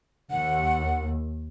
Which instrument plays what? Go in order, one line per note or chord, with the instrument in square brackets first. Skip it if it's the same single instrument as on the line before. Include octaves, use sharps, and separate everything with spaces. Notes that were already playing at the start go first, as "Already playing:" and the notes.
[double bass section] D#2 [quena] F#5